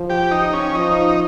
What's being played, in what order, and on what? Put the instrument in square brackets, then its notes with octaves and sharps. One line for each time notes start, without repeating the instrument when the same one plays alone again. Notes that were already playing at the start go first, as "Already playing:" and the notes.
Already playing: [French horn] F3
[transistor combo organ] G4
D#4
C#4
[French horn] F3 [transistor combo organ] D#4